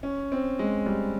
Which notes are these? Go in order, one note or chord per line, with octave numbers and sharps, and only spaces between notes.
C#4
C4
G#3
G3